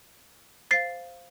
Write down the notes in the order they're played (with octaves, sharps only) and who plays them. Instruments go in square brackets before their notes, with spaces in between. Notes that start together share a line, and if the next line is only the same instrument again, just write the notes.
[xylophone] C5 F5 A6 C7